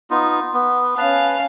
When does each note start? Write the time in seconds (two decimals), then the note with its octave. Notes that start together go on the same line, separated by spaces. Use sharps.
0.11 B3 D#4 F4
0.54 B3
0.97 C#4 B4 F5 A5